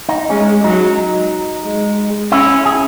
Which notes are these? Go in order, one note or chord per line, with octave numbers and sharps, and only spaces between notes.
D#4
G#3 C#4
F#3 D#4
G#3
C#4 E4
G#4